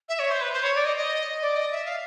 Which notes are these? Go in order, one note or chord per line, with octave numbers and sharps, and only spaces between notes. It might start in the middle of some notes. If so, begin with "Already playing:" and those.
E5
C#5
C5
B4
C5
C#5
D5
D#5
D#5
D5
D#5
E5
F5